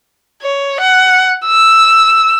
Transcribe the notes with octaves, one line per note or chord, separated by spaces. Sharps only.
C#5
F#5
E6